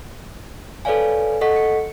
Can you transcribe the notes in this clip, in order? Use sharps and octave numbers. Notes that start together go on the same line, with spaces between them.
A4 B4 C#5 D5 F5 G#5
A4 D#5 F#5 C#6 B6
C#7